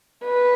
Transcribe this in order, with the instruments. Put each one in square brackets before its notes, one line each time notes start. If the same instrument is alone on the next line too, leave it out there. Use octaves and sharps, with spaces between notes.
[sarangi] B4